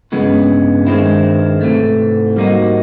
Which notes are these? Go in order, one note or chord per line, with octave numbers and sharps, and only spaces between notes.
G2 C#3 E3 G#3 B3
D#3 G#3 C4 E4
G#2 C3 E3 A3
G3 A#3 D#4 F#4